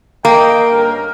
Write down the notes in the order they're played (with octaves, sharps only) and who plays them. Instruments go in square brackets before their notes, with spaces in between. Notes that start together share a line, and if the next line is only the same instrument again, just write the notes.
[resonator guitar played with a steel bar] A#3 [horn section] D#5 G5
[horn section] G2 C#4 A#4